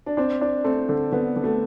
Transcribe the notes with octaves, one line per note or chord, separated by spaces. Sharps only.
D4
C4 D4
D4
A3 C4
D3
D3 B3
D3
A3